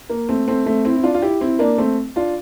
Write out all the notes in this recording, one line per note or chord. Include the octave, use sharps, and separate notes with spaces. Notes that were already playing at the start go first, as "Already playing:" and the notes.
A#3
A3 C4
A3 C4
A3 C4
C4 E4
E4
D4 F4
F4
E4 G4
C4 E4
A#3 D4
A3 C4
D4 F4